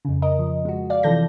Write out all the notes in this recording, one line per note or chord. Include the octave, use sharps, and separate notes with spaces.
F2 C#3
A#4 D#5
F3
G#3 F#4
D5 F5
C3 E3 F3 A4 G6 A#6